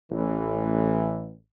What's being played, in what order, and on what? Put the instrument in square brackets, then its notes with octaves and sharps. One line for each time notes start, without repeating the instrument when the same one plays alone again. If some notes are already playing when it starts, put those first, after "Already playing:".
[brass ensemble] A1 E3